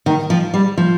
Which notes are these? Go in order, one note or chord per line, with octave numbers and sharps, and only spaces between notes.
D#3
F3
G3
F3